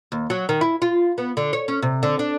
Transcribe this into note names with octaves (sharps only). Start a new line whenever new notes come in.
D#2
F#3
D#3
E4
F4
B3
D3
C#5
C#4
C3
D3
D4